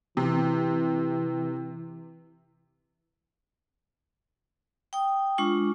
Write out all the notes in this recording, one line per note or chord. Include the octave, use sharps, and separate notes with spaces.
C3 E3
G5 D#6
G#3 D4 F4 C#6